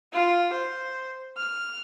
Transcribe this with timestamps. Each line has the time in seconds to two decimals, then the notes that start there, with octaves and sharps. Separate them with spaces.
0.13 F4
0.53 C5
1.37 F6